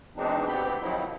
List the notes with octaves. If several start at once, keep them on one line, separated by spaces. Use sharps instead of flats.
B2 E3 G#3 C4 D4 D#4
D2 B3 C4 G4 B5 G6
D#3 F3 F#3 C4 D#4 E4